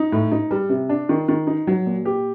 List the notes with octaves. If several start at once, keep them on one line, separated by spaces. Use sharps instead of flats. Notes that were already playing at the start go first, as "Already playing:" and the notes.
Already playing: D#4
A2
D#4
G3
C3
D4
D#3
D#3
D#4
F#3
A#2
G4